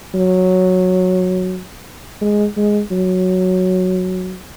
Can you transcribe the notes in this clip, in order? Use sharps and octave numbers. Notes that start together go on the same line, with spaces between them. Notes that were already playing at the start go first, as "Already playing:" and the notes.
F#3
G#3
G#3
F#3